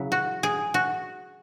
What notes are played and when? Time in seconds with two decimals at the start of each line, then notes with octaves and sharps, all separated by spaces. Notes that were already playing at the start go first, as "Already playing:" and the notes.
Already playing: C#3 F#3 E4
0.12 F#4
0.43 G#4
0.74 F#4